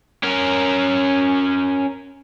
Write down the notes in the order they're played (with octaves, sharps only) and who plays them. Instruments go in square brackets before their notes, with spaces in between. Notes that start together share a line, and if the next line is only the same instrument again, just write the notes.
[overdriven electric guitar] C#4 A#4